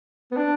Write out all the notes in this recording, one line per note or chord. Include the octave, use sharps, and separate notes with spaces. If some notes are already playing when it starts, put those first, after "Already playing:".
B3
D4